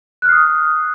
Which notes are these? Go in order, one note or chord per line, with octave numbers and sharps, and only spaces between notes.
D#6 F6 F#6 C7